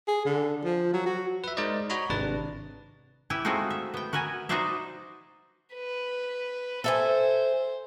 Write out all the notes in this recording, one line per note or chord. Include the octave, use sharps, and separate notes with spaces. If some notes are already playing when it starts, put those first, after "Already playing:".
G#4
D3
F3
F#3
F#4
B4 E5
G#3 D#4 A#4 C5 D5 D#5
F#4 C#5 D#5 A#5 B5
G#1 C3 D4 B4 A6
E4 G4 B4 E5
G#3 A3 C4 D#4 F4 F#4
E5
B3 G5
F#4 A#4 B4 E5 G#5
D#4 F#4 B4 C5 D5 E5
B4
A4 C5 E5 G#5